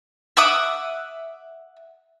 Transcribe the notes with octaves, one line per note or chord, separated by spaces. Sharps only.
E5 F#5 D6 D#6